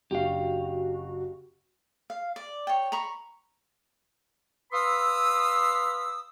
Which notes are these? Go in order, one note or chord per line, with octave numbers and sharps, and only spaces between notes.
F#1 F#3 D4 F#4 G4 F5
F5
D5
C#5 G5
A#5 B5 C#6
B4 F5 B5 C6 D#6 E6